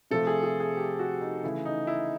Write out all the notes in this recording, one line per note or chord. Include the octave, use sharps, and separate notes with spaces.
C3 F3 A3 A4
G#4
G#4
G#4
G4
F#4
D#4
C#3 E3 A3 E4
D#4
E4